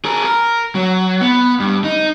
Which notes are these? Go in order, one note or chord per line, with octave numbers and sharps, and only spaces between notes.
G#4 A#4
A#4
F#3
B3
G2
D#4